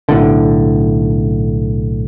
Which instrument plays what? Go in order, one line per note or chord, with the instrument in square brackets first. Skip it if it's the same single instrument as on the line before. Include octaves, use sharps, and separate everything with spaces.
[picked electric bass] B1 A2 D3